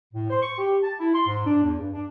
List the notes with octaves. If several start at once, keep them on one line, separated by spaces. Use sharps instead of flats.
A2
C5
C#6
G4
A5
E4
C6
G#2
D4
E2
G2
D4